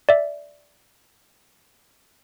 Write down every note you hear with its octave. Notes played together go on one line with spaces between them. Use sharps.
D5 E5